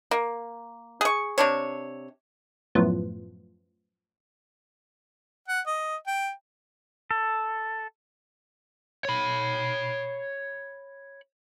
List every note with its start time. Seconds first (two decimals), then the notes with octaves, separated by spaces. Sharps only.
0.11 A#3
1.01 G#4 C#6
1.38 C3 D4 C#5
2.75 F#2 A2 F3 B3
5.48 F#5
5.67 D#5
6.07 G5
7.11 A4
9.05 C#5 B5